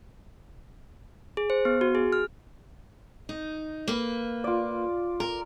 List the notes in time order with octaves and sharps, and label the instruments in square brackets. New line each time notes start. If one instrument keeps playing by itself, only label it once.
[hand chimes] G#4
C5
B3
F#4
G#4
F6
[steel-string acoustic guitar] D#4
A#3 B4
[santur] F4 D5
[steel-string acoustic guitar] A#4